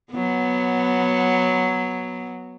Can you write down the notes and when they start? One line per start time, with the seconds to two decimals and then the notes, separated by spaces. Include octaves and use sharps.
0.12 F#3 B3